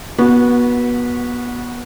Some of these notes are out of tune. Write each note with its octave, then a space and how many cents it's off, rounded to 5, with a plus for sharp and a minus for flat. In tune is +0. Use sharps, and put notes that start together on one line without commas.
B3 -25 F#4 +0